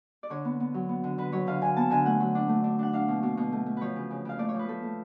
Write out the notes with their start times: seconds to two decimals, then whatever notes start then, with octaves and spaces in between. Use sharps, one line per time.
0.23 D5
0.30 D3 C#5
0.45 B3
0.60 B3
0.74 F#3
0.89 B3
1.04 D3
1.18 D3 B4
1.32 F#3 C#5
1.47 D3 F5
1.61 D3 G#5
1.77 B3 A5
1.90 D3 G#5
2.05 A3 F#5
2.20 F#3
2.35 D4
2.49 A3
2.64 D4
2.79 D4 F#5
2.93 D4 F5
3.08 B2
3.23 B2
3.37 B2
3.52 A3
3.66 A3
3.77 F3 B4 C#5
3.96 C#3
4.11 C#3
4.25 C#3 F5
4.39 A3 D5
4.49 C#5
4.54 F3
4.59 B4
4.69 A3 A4
4.83 A3